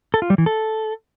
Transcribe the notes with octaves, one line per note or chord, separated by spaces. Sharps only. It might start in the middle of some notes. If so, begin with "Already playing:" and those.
A4
F4
G3
E3
A4